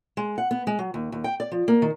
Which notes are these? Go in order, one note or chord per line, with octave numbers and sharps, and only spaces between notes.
G#3
F#5
B3
G#3
F#3
D#2
D#2
G5
D5
F3
A#3
D#3